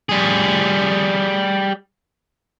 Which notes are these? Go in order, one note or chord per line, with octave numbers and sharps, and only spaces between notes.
G3 G#4